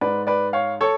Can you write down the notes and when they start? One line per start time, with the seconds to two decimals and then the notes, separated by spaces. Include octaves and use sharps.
0.01 G#2 G#3 B4 D5
0.27 B4 D5
0.53 C#5 F5
0.81 A4 C#5